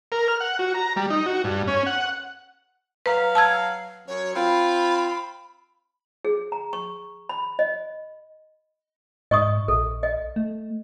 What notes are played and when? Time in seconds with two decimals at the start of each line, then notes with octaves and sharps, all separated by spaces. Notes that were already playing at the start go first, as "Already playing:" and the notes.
0.12 A#4
0.28 F6
0.40 F#5
0.59 F#4
0.74 A#5
0.96 G3
1.10 D#4
1.26 F#4
1.44 G2
1.68 C#4
1.86 F#5
3.06 F#3 B4 F5 A#5
3.35 A5 E6 G#6
4.08 F#2 C#5
4.35 C4 F4 B5
6.25 G#4
6.52 A#5
6.73 C#6
7.29 B5
7.59 D#5
9.31 G#2 D#5 C#6 D#6
9.68 A#1 A4
10.03 D#5
10.36 A3